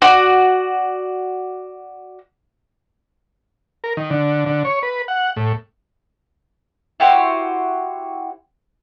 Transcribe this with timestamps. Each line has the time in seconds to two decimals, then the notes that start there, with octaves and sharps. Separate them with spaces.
0.02 F#4 D5
3.84 A#4
3.97 D#3
4.10 D3
4.46 D3
4.65 C#5
4.83 B4
5.08 F#5
5.36 A2
7.00 E4 F#4 G4 C5